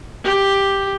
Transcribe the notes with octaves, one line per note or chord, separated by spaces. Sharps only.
G4